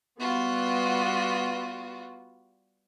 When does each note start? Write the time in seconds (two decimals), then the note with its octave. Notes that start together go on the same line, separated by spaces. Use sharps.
0.20 G3 B3 F4 F#4